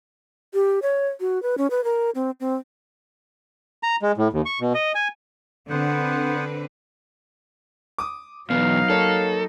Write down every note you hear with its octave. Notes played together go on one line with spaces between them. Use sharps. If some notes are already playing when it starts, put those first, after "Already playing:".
G4
C#5
F#4
B4
C#4
B4
A#4
C4
C4
A#5
G#3
A2
D#2
C#6
B2
D#5
G#5
D3 B3 C4 B4 C5 F#5
D6 D#6
E2 B2 F#3 B3 D#4 F5
A#3 A4 C#5